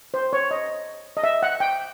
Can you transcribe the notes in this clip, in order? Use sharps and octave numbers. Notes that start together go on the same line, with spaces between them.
C5
C#5
D#5
D#5
E5
F#5
G5